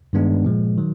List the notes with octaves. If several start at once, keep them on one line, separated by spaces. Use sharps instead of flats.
G2 D#3 G#3 B3 D4
A#2 F3 G#3
D#3 F#3